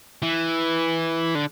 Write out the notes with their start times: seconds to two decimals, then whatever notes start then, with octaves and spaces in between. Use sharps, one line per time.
0.22 E3
1.35 D3